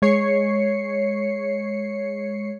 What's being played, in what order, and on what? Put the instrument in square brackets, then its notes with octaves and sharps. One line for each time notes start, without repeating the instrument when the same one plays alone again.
[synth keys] G#3 C#5 C7 C#7